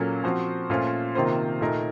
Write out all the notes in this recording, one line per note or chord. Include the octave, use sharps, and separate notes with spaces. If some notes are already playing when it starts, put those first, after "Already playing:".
Already playing: A#2 F#3 A#3 C#4 A4
F3 C4 F#4 C5
A#2 A3 C#4 F4 C5
C3 D#3 A#3 F4 C5
A#2 A3 D#4 A#4